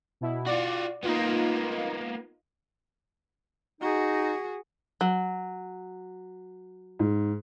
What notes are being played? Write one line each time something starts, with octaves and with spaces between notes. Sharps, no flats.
B2 E4
F4 F#4 D5
A#3 B3 D#4 F4
D#4 F#4 G#4
F#3
G#2